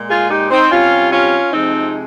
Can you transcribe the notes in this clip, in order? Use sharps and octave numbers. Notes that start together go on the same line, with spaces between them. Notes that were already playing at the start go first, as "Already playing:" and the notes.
Already playing: A#2 G#3
F4 G#4
D#4 G4
C4 D#4
C3 G3 C#4 F4
C#4 F4
F2 C3 F3 G#3 C4 D#4